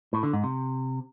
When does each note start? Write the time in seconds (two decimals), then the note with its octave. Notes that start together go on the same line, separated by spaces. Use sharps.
0.13 A2
0.23 D3
0.33 G#2
0.44 C3